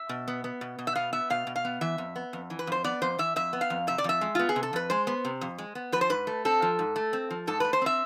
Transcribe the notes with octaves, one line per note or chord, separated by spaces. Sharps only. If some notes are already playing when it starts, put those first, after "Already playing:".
Already playing: E5
B2
B3
B3
B2
B2
E5
B3 F5
B3 E5
B2 F5
B2
F5
B3
E3 E5
F2
B3
F2
E3
B4
F2 C5
B3 D5
F2 C5
E3 E5
F2 E5
B3
F5
F2
C3 E5
D5
F2 E5
G#3
B3 F4
G#4
C3
A4
F2 B4
G#3 C5
B3
C3
F2
G#3
B3
F3 B4
C5
G#2 B4
A3
C4 A4
F3
G#2
A3
C4
F3
G#2 A4
A3 B4
C5
C4 E5